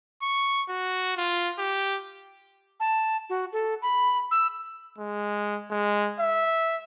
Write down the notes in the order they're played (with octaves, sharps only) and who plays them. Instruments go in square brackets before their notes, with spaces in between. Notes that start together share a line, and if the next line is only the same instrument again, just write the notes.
[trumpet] C#6
F#4
F4
G4
[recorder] A5
F#4
A4
B5
E6
[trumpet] G#3
G#3
E5